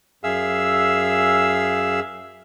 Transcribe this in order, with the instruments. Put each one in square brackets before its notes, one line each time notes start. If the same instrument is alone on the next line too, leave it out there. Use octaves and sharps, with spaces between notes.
[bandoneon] F#2 G#4 E5 F5 E6